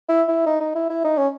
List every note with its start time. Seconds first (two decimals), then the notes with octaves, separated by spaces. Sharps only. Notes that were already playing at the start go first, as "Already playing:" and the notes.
0.09 E4
0.28 E4
0.46 D#4
0.60 D#4
0.75 E4
0.89 E4
1.05 D#4
1.18 C#4